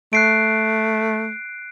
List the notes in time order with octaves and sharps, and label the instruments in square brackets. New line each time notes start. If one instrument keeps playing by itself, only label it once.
[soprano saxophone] A3 [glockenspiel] F#6 C7 D7